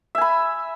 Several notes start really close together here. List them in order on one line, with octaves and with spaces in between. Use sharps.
E5 G#5 B5